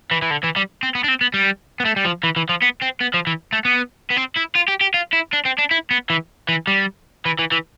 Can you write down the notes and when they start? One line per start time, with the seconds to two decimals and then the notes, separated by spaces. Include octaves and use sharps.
0.11 E3
0.22 E3
0.30 D3
0.43 E3
0.56 G3
0.83 C4
0.95 B3
1.04 D4
1.08 C4
1.21 B3
1.34 G3
1.80 B3
1.85 A3
1.96 G3
2.05 F3
2.24 E3
2.36 E3
2.49 F3
2.62 B3
2.82 C4
3.01 B3
3.14 F3
3.27 E3
3.53 A3
3.65 B3
4.11 B3
4.17 C4
4.37 E4
4.56 F4
4.68 G4
4.81 G4
4.94 F4
5.13 E4
5.33 D4
5.46 C4
5.59 D4
5.71 E4
5.91 B3
6.10 E3
6.49 E3
6.67 G3
7.26 E3
7.39 E3
7.52 E3